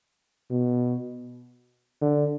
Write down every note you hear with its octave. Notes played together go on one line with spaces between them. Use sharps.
B2
D3